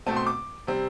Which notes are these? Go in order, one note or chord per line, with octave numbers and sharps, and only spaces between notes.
B2 A3 C4 A5
C6
D6
C3 G3 C4